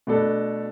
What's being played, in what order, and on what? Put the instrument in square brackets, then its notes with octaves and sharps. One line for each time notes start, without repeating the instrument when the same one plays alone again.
[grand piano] B2 A3 D4 A4